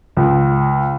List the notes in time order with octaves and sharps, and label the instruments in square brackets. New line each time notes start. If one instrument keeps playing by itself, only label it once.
[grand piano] C#2